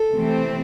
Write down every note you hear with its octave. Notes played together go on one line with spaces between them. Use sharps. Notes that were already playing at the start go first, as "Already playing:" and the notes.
Already playing: A4
C3 E3 A3 C4